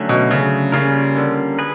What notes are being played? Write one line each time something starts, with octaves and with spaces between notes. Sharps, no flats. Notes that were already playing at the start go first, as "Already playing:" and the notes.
Already playing: D3 F#3 A3 C#4
B2
C#3
C#3 G3 A#3 C#4 F4 A#4
D3
G#4 B4